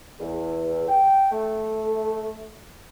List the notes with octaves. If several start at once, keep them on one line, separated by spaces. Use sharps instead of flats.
E2
G5
A3